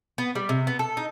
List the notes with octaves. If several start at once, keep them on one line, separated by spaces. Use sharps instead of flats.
B3
G3
C3
B3
A4
D#4